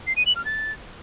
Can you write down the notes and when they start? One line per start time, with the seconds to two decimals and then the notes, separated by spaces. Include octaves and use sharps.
0.07 C7
0.17 D#7
0.26 F#7
0.36 F6
0.45 A6